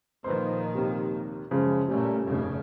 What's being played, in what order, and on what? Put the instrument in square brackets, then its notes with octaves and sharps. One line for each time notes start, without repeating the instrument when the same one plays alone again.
[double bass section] A#2 D#3 F3 [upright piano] B4 C5
[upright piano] D#2 C3
[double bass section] F#2 [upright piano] C#3 F3 G#3
[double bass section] A#2 A3 [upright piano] G3 C#4
[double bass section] F1 G2 C#3